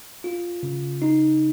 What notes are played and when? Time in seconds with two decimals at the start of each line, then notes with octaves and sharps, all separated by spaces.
0.24 F4
0.63 C#3
1.02 D#4